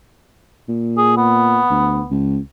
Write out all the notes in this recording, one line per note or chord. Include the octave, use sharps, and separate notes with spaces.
A#2
G#4
B3
D2
C#2